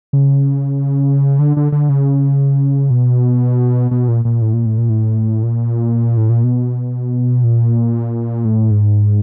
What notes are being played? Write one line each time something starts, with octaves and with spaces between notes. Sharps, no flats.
C#3
D3
D3
D3
C#3
B2
B2
A#2
A#2
A2
A#2
A2
A#2
A2
A#2
A2
A#2
B2
A#2
A2
G#2